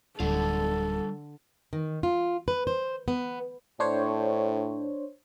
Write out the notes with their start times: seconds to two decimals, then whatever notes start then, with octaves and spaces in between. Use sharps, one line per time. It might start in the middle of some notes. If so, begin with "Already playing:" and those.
0.20 D1 D3 G3 F4 A4
1.73 D#3
2.03 F4
2.48 B4
2.67 C5
3.08 B3
3.80 A2 D4 C5 C#5